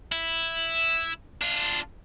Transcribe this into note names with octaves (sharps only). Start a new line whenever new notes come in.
E4
D4 F4